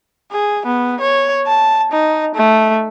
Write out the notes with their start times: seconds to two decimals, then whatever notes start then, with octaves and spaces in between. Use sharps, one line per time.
0.32 G#4
0.66 B3
1.01 C#5
1.47 A5
1.92 D#4
2.35 A3